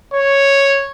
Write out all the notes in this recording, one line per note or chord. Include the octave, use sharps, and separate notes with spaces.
C#5